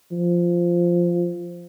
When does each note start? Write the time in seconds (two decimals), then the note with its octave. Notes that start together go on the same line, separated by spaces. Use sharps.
0.12 F3